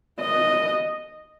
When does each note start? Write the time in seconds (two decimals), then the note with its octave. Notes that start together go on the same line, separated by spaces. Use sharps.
0.21 D#5